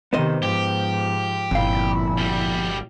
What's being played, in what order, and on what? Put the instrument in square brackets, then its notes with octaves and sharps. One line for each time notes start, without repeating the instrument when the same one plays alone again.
[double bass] C3 D#3 [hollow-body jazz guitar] B3 C5 D#5
[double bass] G#2 F3 [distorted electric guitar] G4
[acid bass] G1 [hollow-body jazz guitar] F2 F5 [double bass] A#2 E4
[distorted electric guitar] B1 G3